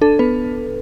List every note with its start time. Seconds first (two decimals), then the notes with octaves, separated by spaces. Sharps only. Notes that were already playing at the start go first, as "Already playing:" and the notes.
0.01 D4 A4
0.19 B3 B4